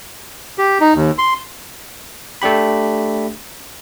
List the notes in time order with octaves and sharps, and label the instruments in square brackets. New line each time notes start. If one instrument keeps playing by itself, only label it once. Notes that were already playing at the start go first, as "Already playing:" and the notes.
[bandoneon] G4
D#4
D#2
C6
[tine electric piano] A3 D4 G4 B5